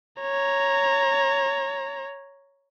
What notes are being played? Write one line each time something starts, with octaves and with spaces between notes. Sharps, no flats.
C#5 A#5